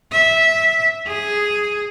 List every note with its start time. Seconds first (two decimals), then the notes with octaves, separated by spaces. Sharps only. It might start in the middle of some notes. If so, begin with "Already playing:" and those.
0.12 E5
1.07 G#4